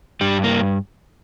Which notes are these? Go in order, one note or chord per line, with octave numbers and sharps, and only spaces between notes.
G2 G3
A#3